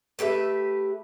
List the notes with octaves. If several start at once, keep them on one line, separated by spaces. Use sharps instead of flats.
A3 G4 B4 E5